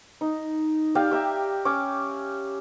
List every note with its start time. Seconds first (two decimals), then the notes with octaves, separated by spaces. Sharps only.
0.21 D#4
0.95 G4 D5 F5 G5
1.11 G4 E5 A#5
1.65 C#4 D6